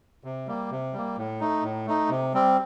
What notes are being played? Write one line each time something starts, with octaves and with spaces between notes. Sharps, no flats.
C3
G3 A#3
C3
G3 A#3
A2
A3 D#4
A2
A3 D#4
C3
G3 C4